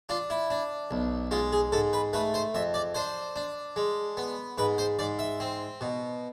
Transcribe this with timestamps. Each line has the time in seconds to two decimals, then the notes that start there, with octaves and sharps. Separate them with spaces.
0.09 D4 F4
0.30 E4
0.50 D4
0.91 B1
1.31 G#3 F4
1.52 G#4
1.72 G#2 A4
1.93 B4
2.13 A3 B4
2.34 C5
2.55 F2 E5
2.74 D5
2.95 D4 C5
3.36 D4
3.76 G#3
4.17 B3
4.58 G#2 B4
4.78 C5
4.99 G#2 D5
5.19 E5
5.40 C4
5.81 B2